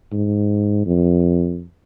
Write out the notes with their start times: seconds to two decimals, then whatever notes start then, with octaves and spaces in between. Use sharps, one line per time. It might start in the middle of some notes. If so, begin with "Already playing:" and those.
0.12 G#2
0.86 F2